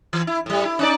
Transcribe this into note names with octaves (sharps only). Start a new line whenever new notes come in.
E3
E4
A2 G3
E4
C#4 D#4 D5